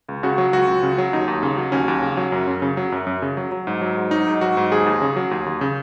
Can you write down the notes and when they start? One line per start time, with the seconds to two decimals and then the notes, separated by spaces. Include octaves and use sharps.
0.09 C#2
0.23 C#3 F#4
0.38 F#3
0.53 C#2 F#4
0.68 C#2
0.83 C#3
0.98 F#3
1.13 D#2 D#4
1.28 D#2
1.43 C#3
1.58 F#3
1.72 D#2 C#4
1.88 D#2
2.03 C#3
2.17 F#3
2.32 F#2
2.47 F#2
2.62 C#3
2.77 F#3
2.92 F#2
3.07 F#2
3.22 C#3
3.37 F#3
3.52 F#3
3.67 G#2
3.81 F#3
3.97 G#2
4.11 F#3 D#4
4.27 G#2
4.41 F#3 F#4
4.57 G#2
4.72 D#2 G#4
4.86 D#2
5.02 C#3
5.16 F#3
5.31 D#2
5.46 D#2
5.61 C#3